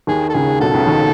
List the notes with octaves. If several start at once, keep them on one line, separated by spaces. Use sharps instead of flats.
D#2 D#3 G#4
A4
C#2 C#3 G#4
B1 B2 A4
C#2 C#3
D#2 D#3